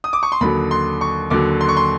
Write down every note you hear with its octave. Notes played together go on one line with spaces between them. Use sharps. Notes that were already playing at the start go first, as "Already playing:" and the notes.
D#6
D6
C#6
C6
D#2 D3 F#3 B5
C6
C#6
D#2 D3 F#3 D6
C6
C#6
C6